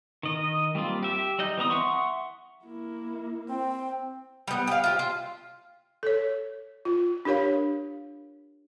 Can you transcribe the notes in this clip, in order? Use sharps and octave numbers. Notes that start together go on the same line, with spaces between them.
D#3 D#5
G3 A#3 C4 F4
G4 E5
G3 D#4 D#5 G6
E3 B3 C4 A#5 D#6
E5 F#5 C6 C#6
A#3 E4
C4 G5
G3 B3
G4 F5
F4 G4
F4
A4 C#5
F4
D4 G4 A#4 C#5 F5